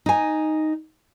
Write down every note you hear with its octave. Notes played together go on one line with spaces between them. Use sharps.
D#4 G#5